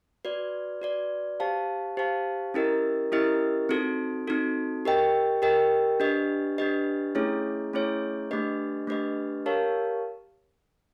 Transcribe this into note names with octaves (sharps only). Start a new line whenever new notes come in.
F#4 B4 D5
F#4 B4 D5
G4 C5 F5 A5
G4 C5 F5 A5
C#4 E4 G4 A#4 D#5
C#4 E4 G4 A#4 D#5
C4 D#4 F#4 A4
C4 D#4 F#4 A4
G4 A#4 D#5 G5
G4 A#4 D#5 G5
D4 G4 B4 D#5
D4 G4 B4 D#5
A3 C#4 E4 G#4 C#5
A3 C#4 E4 G#4 C#5
A3 D4 G4 B4 D#5
A3 D4 G4 B4 D#5
G4 A#4 C#5 F5 A5